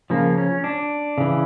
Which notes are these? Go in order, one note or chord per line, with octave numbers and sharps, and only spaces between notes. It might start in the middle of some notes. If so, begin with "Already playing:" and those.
C#3 F3 A#3
C#4
D4
C#3 E3